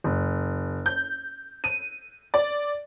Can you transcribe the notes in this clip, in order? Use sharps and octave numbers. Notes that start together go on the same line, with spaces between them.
F#1
G6
D#7
D5